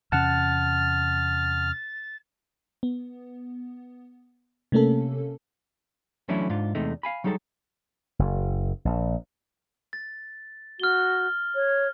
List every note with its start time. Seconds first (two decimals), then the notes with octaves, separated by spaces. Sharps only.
0.12 E2 C3 C#4 F#5 A5 F6 A6
2.83 B3
4.72 C3 A3 A#3 C#4 A4
6.28 E3 F#3 A3 C#4 D4 E4
6.50 G#2 D4 F4
6.75 E2 C3 G#3 A3 D#4
7.03 F5 G#5 B5
7.24 F#3 G3 D#4 G#4 A4
8.19 F#1
8.85 A#1
9.93 A6
10.80 F#4 F6 G7
11.55 C#5